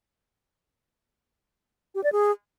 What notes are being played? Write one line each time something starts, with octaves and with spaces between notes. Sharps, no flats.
G4
D5
G#4